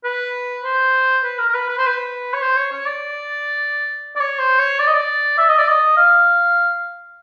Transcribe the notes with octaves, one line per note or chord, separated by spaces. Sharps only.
B4
C5
B4
A#4
A#4
B4
B4
C5
B4
C#5
C5
C#5
C#5
D5
D5
C#5
C5
C#5
D5
D#5
D5
E5
D#5
D5
D#5
F5